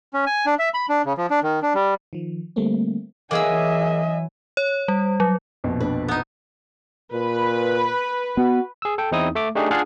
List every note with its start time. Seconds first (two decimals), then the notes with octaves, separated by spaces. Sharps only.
0.13 C#4
0.26 G#5
0.46 D4
0.59 E5
0.74 B5
0.89 D4
1.05 C#3
1.18 F3
1.30 D4
1.43 D#3
1.62 D4
1.75 G3
2.13 D#3 F3
2.56 D3 G3 A3 A#3 C4
3.31 E3 F#3 A#3 G#4 D#5 E5 G#5 E6
4.57 C#5
4.88 G3
5.20 F#3
5.64 A#1 F2 B2
5.80 D4 B4
6.08 B3 D#4
7.13 A#2 B4
8.37 B3 F#4
8.82 G#4 E6
8.98 A4 G5
9.12 E2 C4 D#4 E4 D#6
9.35 A3 E5 D6
9.55 A3 D4 D#4 G4 G#4
9.71 D4 F4 G#4 D5 F5 F#5